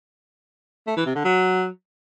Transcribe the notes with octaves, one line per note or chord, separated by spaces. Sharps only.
A3
E3
C3
D3
F#3